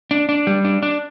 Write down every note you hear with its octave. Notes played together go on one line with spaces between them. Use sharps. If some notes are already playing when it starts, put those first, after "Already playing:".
D4
D4
G3
D4
D4